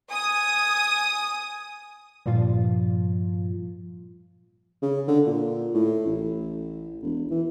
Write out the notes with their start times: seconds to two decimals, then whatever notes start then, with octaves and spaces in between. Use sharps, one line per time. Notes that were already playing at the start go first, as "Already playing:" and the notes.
0.11 G#5 D#6
2.26 G2 A#2 F3 F4
4.82 C#3
5.08 D3
5.27 A#2
5.74 A2
6.06 A1
7.03 E1
7.31 E3